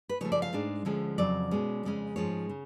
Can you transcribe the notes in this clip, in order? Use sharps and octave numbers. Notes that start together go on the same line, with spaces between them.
B4
C#3 F3 A3 C#5
D5
F5
G#2 G#3 D4
D2 D3 F3 G#3 C#4
F2 C#3 F#3 D5
B2 G#3 C#4
F2 C#3 G#3 C#4
G#2 F3 G#3 C#4 C#5
C#3